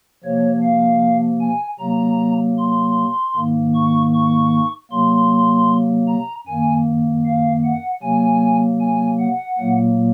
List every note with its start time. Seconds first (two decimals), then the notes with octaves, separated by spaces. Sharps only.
0.24 C3 F3 A#3 C#5
0.63 F5
1.41 G#5
1.79 C3 F#3 A#3 A#5
2.58 C6
3.35 G#2 D#3 A#3
3.75 C#6
4.14 C#6
4.91 C3 F#3 A#3 C6
6.08 A#5
6.47 F#2 D#3 A#3 G#5
7.26 F5
7.64 F#5
8.02 C3 F#3 A#3 G#5
8.80 G#5
9.19 F#5
9.58 A#2 F#3 A#3